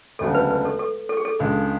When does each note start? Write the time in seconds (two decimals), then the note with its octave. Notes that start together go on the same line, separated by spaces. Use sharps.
0.19 E1 D2 C#3 F#3 A3 A4
0.35 B4
0.50 B4
0.65 A4
0.79 A4
1.09 A4
1.17 G#4
1.25 A4
1.39 C#2 C#3 G#3 D4